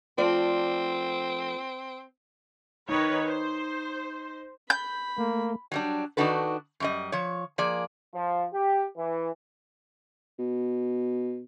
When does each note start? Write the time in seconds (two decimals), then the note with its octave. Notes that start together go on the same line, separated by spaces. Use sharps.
0.18 F3 A3 C4 D5
2.89 D#3 D#4 B4 C#5
3.26 C5
4.70 B5 G6
5.18 A3 A#3
5.72 F#3 G3 D4
6.17 D#3 D4 D#4 F#4 A4 B4
6.80 F#2 G3 D#5
7.12 F3 C#5
7.58 F3 A#3 G#4 D5
8.14 F3
8.54 G4
8.97 E3
10.39 B2